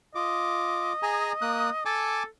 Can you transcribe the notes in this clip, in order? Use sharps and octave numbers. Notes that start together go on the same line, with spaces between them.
F4 D#5 D6
G#4 G#5 A#5
A#3 D#6 F#6
A4 G#5 A5 D6